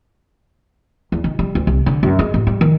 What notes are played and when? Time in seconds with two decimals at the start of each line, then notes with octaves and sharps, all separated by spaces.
1.12 E2
1.24 D#3
1.39 G3
1.55 D2
1.67 C2
1.86 D3
2.03 F#2
2.19 G#3
2.34 A1
2.47 G3
2.61 D#3